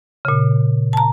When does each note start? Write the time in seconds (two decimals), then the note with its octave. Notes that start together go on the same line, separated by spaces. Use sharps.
0.25 A#2 C#3
0.93 A5 A#5